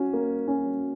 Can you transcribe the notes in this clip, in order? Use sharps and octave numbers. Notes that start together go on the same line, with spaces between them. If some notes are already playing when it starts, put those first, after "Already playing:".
Already playing: C#4 F#4
A#3
C#4